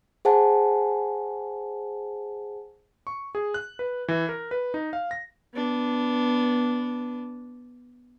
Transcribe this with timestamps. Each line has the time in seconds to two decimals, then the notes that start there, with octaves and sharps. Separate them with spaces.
0.25 G#4 C5 F#5 G#5 A5
3.07 C#6
3.35 G#4
3.54 F#6
3.79 B4
4.08 E3
4.29 A#4
4.51 B4
4.74 D#4
4.93 F5
5.11 A#6
5.54 B3 D4